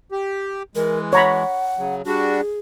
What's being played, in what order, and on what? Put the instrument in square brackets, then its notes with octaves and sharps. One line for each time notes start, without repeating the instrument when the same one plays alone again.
[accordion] G4
[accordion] E3 G#3 [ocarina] A#4
[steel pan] C#5 A#5 B5 [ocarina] F#5
[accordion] C#3 F#3
[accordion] G3 D4 F#4 [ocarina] G#4